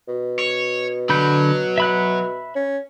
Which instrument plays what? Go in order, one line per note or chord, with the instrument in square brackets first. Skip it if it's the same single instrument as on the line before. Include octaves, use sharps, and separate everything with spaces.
[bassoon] B2
[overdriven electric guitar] C#5
[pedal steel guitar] D3 B5 G6 [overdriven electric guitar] F#3
[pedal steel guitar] E5 B5 F#6
[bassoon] C#4